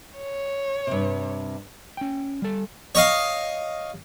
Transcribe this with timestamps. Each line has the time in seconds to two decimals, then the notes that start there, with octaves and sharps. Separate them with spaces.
0.18 C#5
0.87 G2 C3
1.97 C#4 G5
2.42 G3 A4
2.95 C#5 D#5 F5